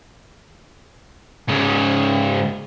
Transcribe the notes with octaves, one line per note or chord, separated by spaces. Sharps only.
G#2 C#3